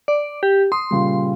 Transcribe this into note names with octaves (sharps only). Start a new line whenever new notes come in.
D5
G4
C6 D#6
A#2 C#3 G3